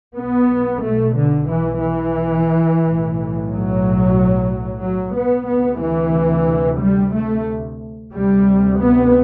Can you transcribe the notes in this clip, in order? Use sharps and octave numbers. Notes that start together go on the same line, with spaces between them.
B1 B2 B3
A3
D3
E3
E3
B1 A2
F#3
F#3
B3
D2 C3 B3
E3
G3
A3
D2 C3 G3
B3